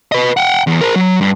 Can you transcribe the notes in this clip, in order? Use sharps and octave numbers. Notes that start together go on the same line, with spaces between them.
B4 D#5
F#5 G5
E2
A#4 C5
F#3
G2